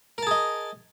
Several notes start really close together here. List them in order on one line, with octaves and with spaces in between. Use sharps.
A#4 A5 G#4 D#5